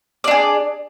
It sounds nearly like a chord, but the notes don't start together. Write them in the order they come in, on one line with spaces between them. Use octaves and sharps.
D5 D4 G#4